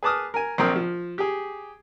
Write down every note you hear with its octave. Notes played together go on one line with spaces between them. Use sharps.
G#4 B4 A5 D6 D#6 F6
A#4 G#5
A#1 C4 A#4 G5 C6 D#6
F3
G4 G#4